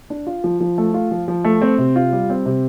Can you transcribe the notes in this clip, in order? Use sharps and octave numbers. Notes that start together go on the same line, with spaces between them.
D4
F4
F3
F3
A3
F4
F3
F3
A3
C4
C3
F4
G3
C4
C3